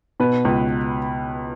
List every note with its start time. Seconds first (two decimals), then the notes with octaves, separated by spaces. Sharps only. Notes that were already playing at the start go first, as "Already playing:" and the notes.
0.20 B2 B4
0.45 C#2